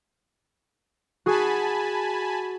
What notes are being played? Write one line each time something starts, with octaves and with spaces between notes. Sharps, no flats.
F#4 G#4 G#5 A5 B5